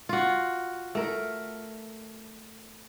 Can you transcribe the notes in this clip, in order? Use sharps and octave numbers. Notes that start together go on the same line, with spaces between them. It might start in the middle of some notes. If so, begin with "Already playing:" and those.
F4 F#4
A3 A#4